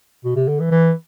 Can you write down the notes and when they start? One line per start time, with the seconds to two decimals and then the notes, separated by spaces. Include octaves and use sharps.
0.24 B2
0.36 C3
0.48 D3
0.60 E3
0.71 E3